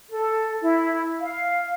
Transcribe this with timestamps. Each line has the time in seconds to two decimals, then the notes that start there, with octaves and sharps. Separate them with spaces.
0.10 A4
0.62 E4
1.21 F5